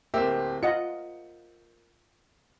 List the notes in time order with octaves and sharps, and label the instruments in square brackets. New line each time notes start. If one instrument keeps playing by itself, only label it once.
[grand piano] D1 C4 G4 [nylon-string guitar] A#3 [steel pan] E5
[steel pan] F4 D#5 F#5 [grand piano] C#7